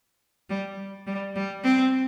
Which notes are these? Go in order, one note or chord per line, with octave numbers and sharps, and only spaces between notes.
G3
G3
G3
C4